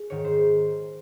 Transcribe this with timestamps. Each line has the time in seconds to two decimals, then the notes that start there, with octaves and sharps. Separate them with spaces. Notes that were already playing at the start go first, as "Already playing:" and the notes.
Already playing: G#4
0.10 G#2 D#3 C#5
0.25 C5